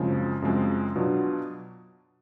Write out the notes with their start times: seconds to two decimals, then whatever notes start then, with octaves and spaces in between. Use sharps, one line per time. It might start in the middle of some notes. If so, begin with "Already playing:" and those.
Already playing: F#2 C#3 F3 G#3 C4
0.42 F#2 C#3 F3 G#3 C4
0.95 B2 F#3 B3 D4 F4